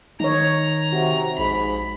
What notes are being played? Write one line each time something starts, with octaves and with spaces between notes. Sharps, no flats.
D#3 D#4 C#5 A#5
C3 F#4
A#1 G#2 B5